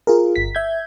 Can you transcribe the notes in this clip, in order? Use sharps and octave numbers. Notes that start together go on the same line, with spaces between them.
F4 G#4 A#4
G1 B6
E5 G6 G#6